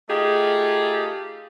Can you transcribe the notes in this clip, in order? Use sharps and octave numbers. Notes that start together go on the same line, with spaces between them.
A3 D#4 F4 G4 G#4